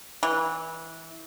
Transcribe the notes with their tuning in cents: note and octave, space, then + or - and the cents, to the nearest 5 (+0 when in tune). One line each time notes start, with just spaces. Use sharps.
E3 -20